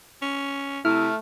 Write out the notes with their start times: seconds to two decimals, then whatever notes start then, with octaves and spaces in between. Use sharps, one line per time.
0.22 C#4
0.85 C3 A3 E4 F6